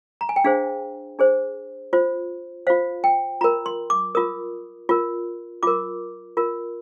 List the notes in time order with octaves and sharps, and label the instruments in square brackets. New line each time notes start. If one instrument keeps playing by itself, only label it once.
[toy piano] A#5
G#5
G5
D4 G#4 C5 F5
D4 G#4 C5
F4 C5
F4 C5 F5
G5
F4 A#4 A#5
C6
D6
F4 A#4 D#6
F4 A#4
F4 A#4 D6
F4 A#4